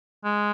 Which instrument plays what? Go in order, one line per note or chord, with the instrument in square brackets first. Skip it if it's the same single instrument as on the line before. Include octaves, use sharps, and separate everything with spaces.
[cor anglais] G#3